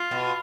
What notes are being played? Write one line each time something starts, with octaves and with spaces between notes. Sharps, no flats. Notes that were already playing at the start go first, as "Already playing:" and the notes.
Already playing: F4
B2